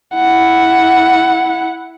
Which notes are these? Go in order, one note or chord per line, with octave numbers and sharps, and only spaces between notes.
E4 F#5